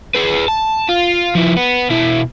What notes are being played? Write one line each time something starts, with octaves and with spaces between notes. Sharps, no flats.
G#4 B4
A5
F4
F3 E4
B3
B2 E4